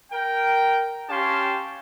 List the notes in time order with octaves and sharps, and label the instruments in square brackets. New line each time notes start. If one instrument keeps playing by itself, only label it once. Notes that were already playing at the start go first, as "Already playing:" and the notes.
[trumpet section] A#4 G5
C#4 G4 F5 A5 C6